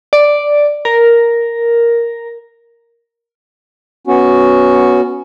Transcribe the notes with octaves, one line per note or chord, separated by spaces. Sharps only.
D5
A#4
B3 C#4 F#4